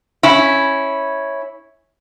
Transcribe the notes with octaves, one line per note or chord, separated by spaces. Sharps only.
C#4 E4